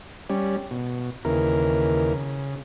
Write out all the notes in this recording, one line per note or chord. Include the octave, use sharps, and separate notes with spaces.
G3 C#4
B2
D#2 C#3 E3 A#4
C#3